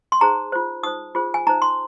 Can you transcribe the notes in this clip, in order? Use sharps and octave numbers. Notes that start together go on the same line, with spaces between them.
C6
D#4 G#4 C5 A#5
F4 C5
D#4 C5 D#6
F4 G#4 C5
G#5
D#4 C5 A#5
C6